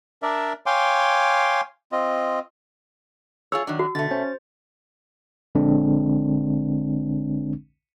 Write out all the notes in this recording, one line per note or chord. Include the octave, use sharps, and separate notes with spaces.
D4 A#4 D5 E5
C#5 F5 G5 G#5 C6 D6
C4 F4 D#5
F4 G#4 C#5 E6
D#3 F#3 D4
F#4
B2 D3 A3 A6
C#4 C5
A#1 D3 G#3 C4 D4